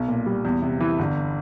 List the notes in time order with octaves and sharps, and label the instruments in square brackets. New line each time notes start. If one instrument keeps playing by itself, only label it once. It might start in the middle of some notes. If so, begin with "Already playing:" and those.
Already playing: [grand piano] B1
A#2
G3
E2
C3
E3
G1